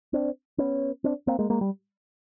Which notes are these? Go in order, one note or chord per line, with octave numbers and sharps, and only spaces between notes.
C4 D4
B3 C#4
C4 D4
A#3 C4
G#3 A#3
G#3 A#3
G3